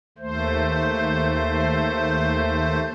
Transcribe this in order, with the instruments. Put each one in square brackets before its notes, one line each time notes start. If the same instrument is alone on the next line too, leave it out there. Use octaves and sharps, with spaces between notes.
[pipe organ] D#2 A3 C5